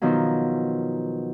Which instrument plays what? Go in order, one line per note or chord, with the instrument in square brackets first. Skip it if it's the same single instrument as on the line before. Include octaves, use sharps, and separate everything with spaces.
[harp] B2 D#3 F3 F#3